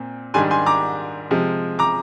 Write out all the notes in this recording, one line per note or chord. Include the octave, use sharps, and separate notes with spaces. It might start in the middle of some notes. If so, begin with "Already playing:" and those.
Already playing: A#2 C4
G#2 D#3 G3 D4 G#5 C6
G#5 C6
A#5 D6
C3 F3 G#3
A#5 D6